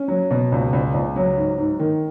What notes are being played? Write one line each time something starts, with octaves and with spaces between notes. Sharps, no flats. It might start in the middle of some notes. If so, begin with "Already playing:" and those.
Already playing: C#4
F#3
B2
C#2
C#2
C#2
F#3
G#2
G#2
D#3